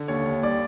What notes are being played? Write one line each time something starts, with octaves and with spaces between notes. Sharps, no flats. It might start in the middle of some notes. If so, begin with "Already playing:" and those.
Already playing: D3
D#2 C#5
D#2
G3 D5